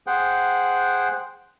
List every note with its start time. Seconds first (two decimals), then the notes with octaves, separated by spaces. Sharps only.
0.07 G#4 C5 F#5 G5